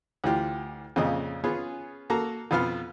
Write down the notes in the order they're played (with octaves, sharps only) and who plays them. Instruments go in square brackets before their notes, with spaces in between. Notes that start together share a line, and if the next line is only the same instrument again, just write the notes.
[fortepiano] D2 E3 F4 G4
F2 A#2 C#3 D#5
B3 C#4 F4 G#4
A#3 F#4 A4 A#5
F2 B2 B3 F4 F5